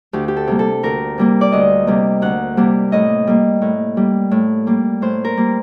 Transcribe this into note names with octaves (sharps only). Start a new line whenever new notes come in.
D2 G4
G4
A4
C3 G3 A#3
A4
D2 A#4
C3 G3 A#3
D5
D2 D#5
C3 G3 A#3
D2 F#5
C3 G3 A#3
A2 D#5
G3 A#3
A2
G3 A#3
A2
G3 A#3
A2 C5
A#4
G3 A#3